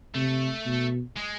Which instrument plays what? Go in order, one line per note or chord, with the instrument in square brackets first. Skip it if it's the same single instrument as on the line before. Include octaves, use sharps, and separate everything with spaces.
[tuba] C3 [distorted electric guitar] A3
[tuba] B2
[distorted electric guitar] G#3